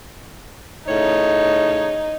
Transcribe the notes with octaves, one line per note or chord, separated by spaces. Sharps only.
A2 C#3 D#4 C#5